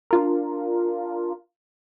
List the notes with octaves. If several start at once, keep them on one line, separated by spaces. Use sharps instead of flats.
D4 F4 A#4